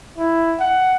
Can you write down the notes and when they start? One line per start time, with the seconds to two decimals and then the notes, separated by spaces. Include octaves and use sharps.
0.18 E4
0.60 F#5